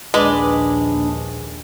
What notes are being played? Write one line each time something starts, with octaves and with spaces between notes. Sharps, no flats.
A#1 D#2 G#3 D4 B4 D5